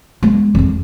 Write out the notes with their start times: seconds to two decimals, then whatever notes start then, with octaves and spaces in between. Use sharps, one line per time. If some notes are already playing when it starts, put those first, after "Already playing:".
0.23 G#3 B3
0.55 F2 G#3